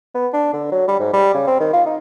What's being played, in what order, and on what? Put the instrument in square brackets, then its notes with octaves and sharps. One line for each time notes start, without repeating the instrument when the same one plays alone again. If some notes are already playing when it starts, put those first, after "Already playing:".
[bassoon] B3
D4
D3
F#3
G3
G#2
G3
C#3
C4
D#3
F4
D#4